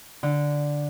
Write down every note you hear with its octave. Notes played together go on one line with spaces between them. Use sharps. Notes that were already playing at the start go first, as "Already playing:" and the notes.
D3